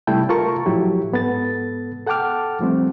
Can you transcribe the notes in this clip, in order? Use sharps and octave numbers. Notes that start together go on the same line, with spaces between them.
C3 G3 A3 E4 G5 A5
F4 A4 A#4 A5 A#5 C#6
A2 F3 F#3 E4 G4
G#2 B3 A4 A6
A4 F#5 G5 A5 D6 F6
F3 G3 A3 C4